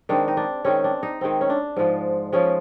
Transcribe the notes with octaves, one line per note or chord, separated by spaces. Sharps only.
D#3 G#3 C4 D4
D#4
D4
D#3 G#3 C4 C#4
D4
D#4
D#3 G#3 C4
C#4
D4
G#2 F3 G#3
F3 G#3 C#4